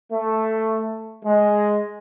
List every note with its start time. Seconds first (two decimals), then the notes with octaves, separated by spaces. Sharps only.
0.12 A3
1.25 G#3